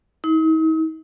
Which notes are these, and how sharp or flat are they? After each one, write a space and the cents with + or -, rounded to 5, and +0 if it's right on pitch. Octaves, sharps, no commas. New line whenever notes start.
D#4 +45